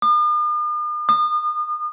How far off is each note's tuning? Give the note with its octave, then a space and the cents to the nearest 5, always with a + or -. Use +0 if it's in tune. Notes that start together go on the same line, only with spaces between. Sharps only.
D#6 -45
D#6 -35